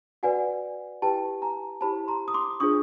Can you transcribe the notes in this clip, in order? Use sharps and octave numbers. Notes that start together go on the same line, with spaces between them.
F#4 B4 D5 F#5 G#5
E4 G4 B4 G5 A5
G#5 A#5
E4 G4 C5 A5 B5
A#5 C6
D#6
C6 D6
D4 F4 G#4 C5 C#6 D#6